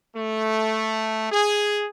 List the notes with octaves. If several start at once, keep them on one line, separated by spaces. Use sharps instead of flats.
A3
G#4